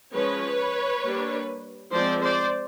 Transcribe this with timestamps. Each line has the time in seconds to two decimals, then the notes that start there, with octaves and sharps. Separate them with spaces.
0.14 F3 G#3 C#4 B4 C#5
1.03 G3 A#3 D4
1.92 F3 G#3 C4 C5 D5
2.22 C5 D5